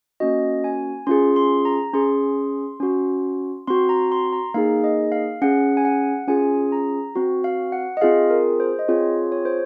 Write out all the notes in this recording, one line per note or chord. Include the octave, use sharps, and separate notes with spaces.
A#3 C#4 F#4 D#5
G#5
C#4 F4 G#4 C6
C6
A#5
C#4 G#4 C6
C#4 F#4
C4 F#4 C6
A#5
C6
A#5
A#3 D#4 G#4 F5
D#5
F5
C#4 G#4 F#5
G#5
F#5
C#4 F4 G#4 G#5
A#5
C4 F#4
F5
F#5
D#5
C4 F4 G#4 F5
A#4
C5
D#5
C4 F4 G#4 C#5
C#5
C5